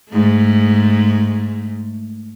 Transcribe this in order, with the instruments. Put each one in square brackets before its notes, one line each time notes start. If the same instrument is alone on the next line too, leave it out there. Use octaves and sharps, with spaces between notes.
[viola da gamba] G#2 A3